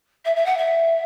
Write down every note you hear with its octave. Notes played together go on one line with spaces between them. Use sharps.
E5
E5
F#5
E5